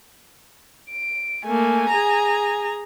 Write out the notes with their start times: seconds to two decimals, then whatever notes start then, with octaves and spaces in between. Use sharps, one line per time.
0.91 D7
1.45 A3 A#3 G#5
1.89 G#4 A#5